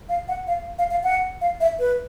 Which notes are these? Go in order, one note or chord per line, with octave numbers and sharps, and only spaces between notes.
F5
F#5
F5
F5
F5
F#5
F5
E5
B4